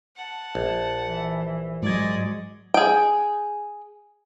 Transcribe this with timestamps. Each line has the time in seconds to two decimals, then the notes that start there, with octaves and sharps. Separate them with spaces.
0.16 F#5 A5
0.55 A#1
1.06 E3
1.83 G#2 F#3 G#3 D5 D#5 G#6
2.74 G#4 G5